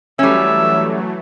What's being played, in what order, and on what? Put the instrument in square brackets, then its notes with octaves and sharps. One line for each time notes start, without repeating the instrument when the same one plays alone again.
[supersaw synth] E3 F#3 A3 [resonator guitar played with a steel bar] G3 C#4 [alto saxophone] E5